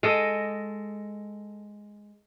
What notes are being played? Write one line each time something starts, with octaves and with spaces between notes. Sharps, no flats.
G#3 A4 D#5